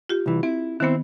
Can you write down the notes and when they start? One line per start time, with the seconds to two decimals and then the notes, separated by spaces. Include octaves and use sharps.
0.09 F4 G4
0.26 C2 E3
0.43 C4 E4
0.80 D#3 B3 C4 E4